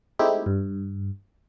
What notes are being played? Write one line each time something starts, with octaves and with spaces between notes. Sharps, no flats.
G#3 A3 C4 D#4 E4 G4
G2